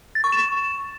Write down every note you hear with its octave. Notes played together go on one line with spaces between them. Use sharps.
A6
C#6
E7